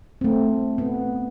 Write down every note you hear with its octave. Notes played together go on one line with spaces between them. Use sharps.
A3 C4
B3